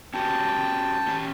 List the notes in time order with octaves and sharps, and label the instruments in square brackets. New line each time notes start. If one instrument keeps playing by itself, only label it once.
[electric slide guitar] C#4 F#4 G4 [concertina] G5 A5
[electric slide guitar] C#4 G4